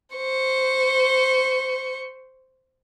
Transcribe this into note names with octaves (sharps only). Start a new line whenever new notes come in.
C5 C#6